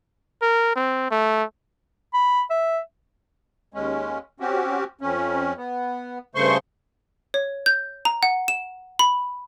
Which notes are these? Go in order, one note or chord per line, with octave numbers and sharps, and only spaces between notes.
A#4
C4
A3
B5
E5
D#2 G#3 C#4
C4 C#4 F#4 G4
F2 C#4
B3
G2 C#3 A3 C5 C6 C#6
C#5
G6
A#5
F#5
E7
B5